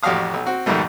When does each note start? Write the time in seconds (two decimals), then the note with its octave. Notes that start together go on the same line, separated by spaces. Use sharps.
0.03 A1 F2 F#4 G4 F5 D#6
0.34 B1
0.46 C4 F#4
0.66 F2 G#2 B2 D#3 G3 A3